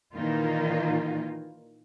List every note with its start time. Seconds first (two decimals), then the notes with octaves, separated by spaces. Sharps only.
0.13 A#2 D#3 E3 A#3 D#4 F4